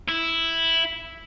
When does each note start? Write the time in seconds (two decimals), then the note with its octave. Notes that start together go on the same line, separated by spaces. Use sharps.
0.08 E4